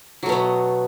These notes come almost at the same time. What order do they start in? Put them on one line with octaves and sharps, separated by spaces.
F#3 A3 B2 B3